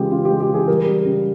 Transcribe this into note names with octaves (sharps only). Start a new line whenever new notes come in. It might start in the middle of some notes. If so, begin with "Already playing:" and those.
Already playing: C#3 E3 G#3 F4 G4 G#4
C#3 F4
G4
G#3
G4
E3
G#4
G3 A#4
G3
C#3